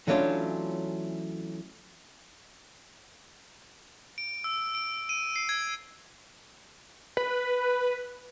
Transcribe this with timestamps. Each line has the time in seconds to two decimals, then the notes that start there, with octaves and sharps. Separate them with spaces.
0.07 E3 F#3 A3 C#4 D4 F4
4.18 D7
4.44 E6
4.75 D7
5.09 D#7
5.36 C7
5.49 G#6
7.17 B4